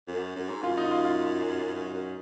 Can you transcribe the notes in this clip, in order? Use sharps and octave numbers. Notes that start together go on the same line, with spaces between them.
F#2
F#2
G#2
F#2 F4
D#4
F4
F4
F#2
F#2